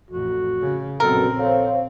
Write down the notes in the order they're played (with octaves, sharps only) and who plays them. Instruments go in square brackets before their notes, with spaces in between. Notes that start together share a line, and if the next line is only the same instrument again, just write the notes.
[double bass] A1 F2 [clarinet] F#4
[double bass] C#3
[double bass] A#1 C4 [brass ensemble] F#2 B2 [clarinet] A4 [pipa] A#4
[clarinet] A4 [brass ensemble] C5 C#5 F5